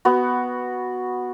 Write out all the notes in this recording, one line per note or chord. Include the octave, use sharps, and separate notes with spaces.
B3 F#4